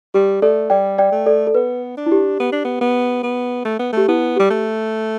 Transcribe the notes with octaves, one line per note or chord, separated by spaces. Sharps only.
G3 G4
A3 A4 D5
G3 D5 G5
D5 G5
A3
A4 D5
A4
B3 B4
D4
E4
G4
B3
D4
B3
B3
B3
A3
B3
A3 G4
B3 E4
G3 G4
A3